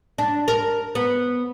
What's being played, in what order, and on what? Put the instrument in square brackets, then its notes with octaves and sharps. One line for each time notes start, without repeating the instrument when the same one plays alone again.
[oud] D4
A#4
B3